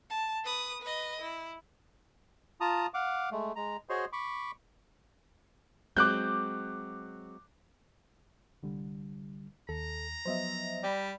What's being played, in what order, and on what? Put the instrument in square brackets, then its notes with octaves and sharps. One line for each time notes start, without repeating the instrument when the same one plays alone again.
[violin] A5
B4 D#6
B4 D#5
E4
[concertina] F4 A5 A#5 D#6
F5 F#5 D6
G#3 A3
G#3 A#5
F#4 G#4 C5 C#5 D#5 C6
B5 C#6 D6
[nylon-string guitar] F#3 G#3 C4 [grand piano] D6 F#6 G6
[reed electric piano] C2 D3 G3
[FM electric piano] D#2 [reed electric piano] A4 [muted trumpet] A#5
[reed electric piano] F3 F#3 B3 [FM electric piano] C5 D#5 E5
[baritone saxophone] G3 [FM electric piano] D5 G5 B5